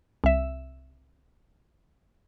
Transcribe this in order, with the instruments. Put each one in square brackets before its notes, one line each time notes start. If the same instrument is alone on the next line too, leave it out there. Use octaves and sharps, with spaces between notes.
[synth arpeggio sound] C2 E5